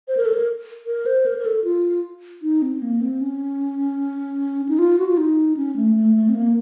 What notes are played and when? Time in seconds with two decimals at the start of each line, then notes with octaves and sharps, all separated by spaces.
0.08 C5
0.17 A#4
0.26 A4
0.33 A#4
0.86 A#4
1.06 C5
1.26 A#4
1.38 A#4
1.46 A4
1.64 F4
2.42 D#4
2.62 C4
2.82 A#3
3.01 C4
3.21 C#4
4.69 D#4
4.79 F4
4.99 F#4
5.09 F4
5.17 D#4
5.57 C#4
5.76 A3
5.95 A3
6.16 A3
6.29 C4
6.35 A#3